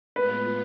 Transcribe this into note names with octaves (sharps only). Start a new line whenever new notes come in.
A2 G#3 B3 F4 B4